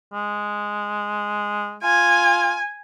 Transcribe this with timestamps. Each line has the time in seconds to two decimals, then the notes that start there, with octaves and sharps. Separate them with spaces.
0.13 G#3
1.83 F4 G#5